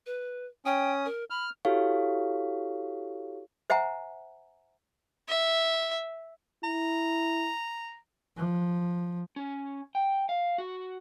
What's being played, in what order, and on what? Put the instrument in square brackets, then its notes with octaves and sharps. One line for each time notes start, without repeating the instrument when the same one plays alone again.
[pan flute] B4
[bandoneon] C#4 D#6 [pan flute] G5
[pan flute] A#4
[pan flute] B5 [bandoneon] F6
[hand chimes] E4 F#4 G4 A4 C#5 F5
[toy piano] C5 E5 F#5 G#5 A#5
[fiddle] E5
[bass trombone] E4 [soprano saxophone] A#5
[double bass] F3
[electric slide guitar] C#4
G5
F5
F#4